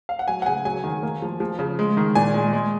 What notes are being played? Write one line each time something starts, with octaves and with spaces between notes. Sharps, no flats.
F5
F#5
F#3 G#5
F#5
C#3 G#5
F#3 G#5
D#3
A#3
F3
F3
C#3
G#3
D#3
A#2 G#5
G#3
G#3